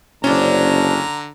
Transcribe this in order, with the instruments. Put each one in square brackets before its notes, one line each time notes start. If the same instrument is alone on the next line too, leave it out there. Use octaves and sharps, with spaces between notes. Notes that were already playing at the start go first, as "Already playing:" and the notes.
[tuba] F#1 [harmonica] D3 A#5 [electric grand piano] C#4 [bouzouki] D4 C5